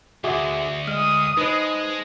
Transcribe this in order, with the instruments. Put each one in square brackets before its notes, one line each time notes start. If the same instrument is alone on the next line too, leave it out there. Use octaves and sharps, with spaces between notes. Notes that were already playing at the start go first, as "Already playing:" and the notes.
[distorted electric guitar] D2 [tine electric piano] F#4 G#4 D6 [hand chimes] E5
[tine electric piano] G#3 [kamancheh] D#6 [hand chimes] F6
[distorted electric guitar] G#3 [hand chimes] D#4 C5 [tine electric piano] B4